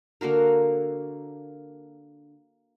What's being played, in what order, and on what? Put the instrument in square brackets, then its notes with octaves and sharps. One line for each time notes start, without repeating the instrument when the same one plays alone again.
[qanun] D3 A#3 F#4 A#4